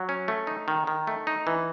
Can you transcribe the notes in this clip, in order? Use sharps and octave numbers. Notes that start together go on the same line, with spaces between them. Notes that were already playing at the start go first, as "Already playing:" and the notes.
Already playing: F#3
C#4
A3
D#4
D#3
D#3
A3
D#4
E3